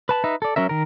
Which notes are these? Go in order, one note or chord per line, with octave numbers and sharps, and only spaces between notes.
B4 A5 B5
D#4 B4 E5
A4 D5
F#3 C#4 A#4 E5
D#3 A#4